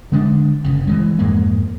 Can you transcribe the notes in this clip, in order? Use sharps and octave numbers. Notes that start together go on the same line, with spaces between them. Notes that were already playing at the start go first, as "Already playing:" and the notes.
D3 G#3 A#3 D4
F#1 C#3
E3 F3 G#3
F2 G#2 G#3 A#3